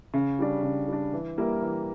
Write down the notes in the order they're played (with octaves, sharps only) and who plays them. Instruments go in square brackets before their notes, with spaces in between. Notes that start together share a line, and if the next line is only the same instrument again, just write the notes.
[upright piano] C#3
G3 D4
C#3
G3 D4
E3
G3 A#3 E4 A#4
E3